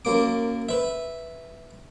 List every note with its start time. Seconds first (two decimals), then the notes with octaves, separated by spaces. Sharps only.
0.05 F#2 A#3 D6
0.69 B4 E5